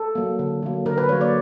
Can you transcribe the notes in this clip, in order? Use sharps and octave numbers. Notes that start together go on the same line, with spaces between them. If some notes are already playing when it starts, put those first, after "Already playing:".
Already playing: A4
F#3 A#3
D3
F#3 A#3
D3 A#4
B4
F#3 A#3 C#5
D5